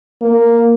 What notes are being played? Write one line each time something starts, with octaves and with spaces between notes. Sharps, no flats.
A#3